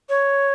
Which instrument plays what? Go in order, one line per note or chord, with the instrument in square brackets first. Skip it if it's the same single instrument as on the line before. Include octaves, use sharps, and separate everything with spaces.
[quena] C#5